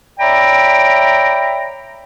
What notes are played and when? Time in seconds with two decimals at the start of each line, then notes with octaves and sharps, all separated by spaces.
0.19 C#5 D5 E5 G5 A#5 B5